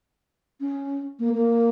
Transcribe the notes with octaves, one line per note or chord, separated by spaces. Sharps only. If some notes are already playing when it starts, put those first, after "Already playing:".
C#4
A#3
A#3